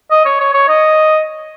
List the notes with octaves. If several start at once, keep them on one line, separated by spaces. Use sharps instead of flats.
D#5
C#5
C#5
C#5
D#5